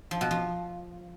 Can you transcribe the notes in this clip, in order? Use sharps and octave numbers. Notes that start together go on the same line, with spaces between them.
F3
B2
F3